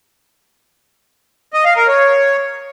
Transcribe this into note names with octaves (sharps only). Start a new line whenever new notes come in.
D#5
F5
A#4
C#5